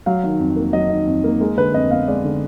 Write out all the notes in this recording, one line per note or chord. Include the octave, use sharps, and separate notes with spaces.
F#3 F5
D#3
F2
A#3
F#3 D#5
D#3
F2
A#3
G#3 A#4
D3 B4
F2 D#5
B3 F5
G#3 D5
D3